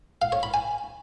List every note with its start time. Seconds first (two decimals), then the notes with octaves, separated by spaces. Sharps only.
0.22 F5
0.32 C#5
0.43 B5
0.54 G#5